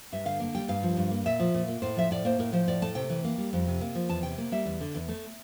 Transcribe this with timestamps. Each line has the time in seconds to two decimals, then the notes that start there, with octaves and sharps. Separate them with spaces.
0.12 G2 E5
0.25 D3 F5
0.40 A#3
0.55 G3 G5
0.68 G2 F5
0.83 F3
0.97 G2
1.11 A#3
1.26 A#2 E5
1.40 F3
1.54 A#2
1.68 A#3
1.82 A2 C5
1.96 F3 E5
2.11 A2 D5
2.25 A#3 C5
2.39 A2 A#4
2.53 F3 C5
2.68 A2 D5
2.82 A3 A5
2.95 C3 G5
3.10 E3
3.24 A#3
3.38 G3
3.53 F2
3.67 C3
3.81 A#3
3.95 F3
4.09 E2 A5
4.23 C3 G5
4.38 A#3
4.52 G3 E5
4.66 E2
4.81 D3
4.95 E2
5.08 A3